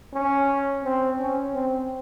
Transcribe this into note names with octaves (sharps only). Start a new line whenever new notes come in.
C#4
C4
C#4
C4